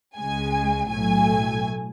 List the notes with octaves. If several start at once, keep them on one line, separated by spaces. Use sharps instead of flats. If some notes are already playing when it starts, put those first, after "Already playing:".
C#2 C#3 G#3 G#5
B1 A2 F#3 A3 G#5